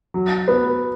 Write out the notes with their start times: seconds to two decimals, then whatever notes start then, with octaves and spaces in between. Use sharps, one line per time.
0.14 F#3
0.48 B3